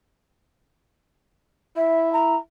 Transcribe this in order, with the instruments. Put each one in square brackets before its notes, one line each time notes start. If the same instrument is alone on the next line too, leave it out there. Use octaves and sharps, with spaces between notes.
[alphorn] E4 [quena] E5
[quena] A#5